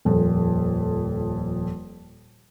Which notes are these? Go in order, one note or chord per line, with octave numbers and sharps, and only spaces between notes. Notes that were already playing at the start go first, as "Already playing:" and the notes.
D#1 F2